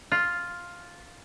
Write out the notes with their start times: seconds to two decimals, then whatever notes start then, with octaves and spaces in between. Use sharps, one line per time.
0.12 F4